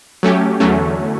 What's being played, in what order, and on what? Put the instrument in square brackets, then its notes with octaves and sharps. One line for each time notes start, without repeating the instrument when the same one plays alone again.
[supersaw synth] F#3 A3 C#4 G4
E2 D3 F#3 A3 C#4